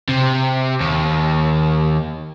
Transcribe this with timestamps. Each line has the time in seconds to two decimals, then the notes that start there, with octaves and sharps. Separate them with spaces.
0.09 C3
0.80 D#2